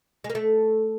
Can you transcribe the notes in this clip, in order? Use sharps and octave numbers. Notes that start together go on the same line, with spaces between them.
G#3
A#3
A3